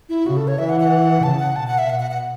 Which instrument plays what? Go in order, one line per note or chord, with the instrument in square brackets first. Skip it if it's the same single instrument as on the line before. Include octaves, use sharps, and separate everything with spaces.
[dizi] E4
[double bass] C#3 [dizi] F#4
[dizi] A4
C#5
[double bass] E3 [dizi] E5
[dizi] F#5
F#5
[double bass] C#3 [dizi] A5
[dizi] F#5
[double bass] B2 [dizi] A5
[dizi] F#5
E5
[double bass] B2 [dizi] F#5
[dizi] F#5
F#5